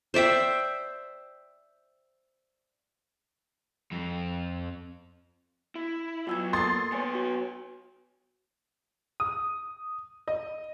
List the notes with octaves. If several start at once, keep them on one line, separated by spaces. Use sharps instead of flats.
C5 D5 E5 G5
F2
E4
B2 F#3 F4 E6 G#6
A#3 A4 C6 D#6 A6 C7
B3 C#5 G#5
F#4
D#6
D#5